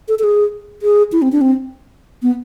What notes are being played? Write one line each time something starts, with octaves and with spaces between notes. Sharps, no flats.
A4
A4
G#4
G#4
E4
C4
D4
C4
B3